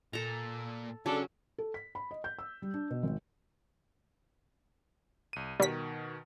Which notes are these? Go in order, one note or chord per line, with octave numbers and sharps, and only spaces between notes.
A#2 A4 A#5
C#3 F#3 C#4 D4 A4
A4
B6
B5
D#5
G6
E6
G3
D4
B2
G#1
C2 D#7
B2 D#3 G3 B6